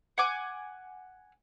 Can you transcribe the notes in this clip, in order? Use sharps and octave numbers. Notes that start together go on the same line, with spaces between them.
F#5 G#5 D6